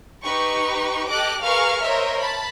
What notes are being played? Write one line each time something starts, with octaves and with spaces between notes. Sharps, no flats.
D#4 G4 B4 C#6
G4 A4 D#5 D6 F#6
G#4 A#4 B4 F5 C#6 F6
A#4 C5 C#5 D#5 E5
A5 B5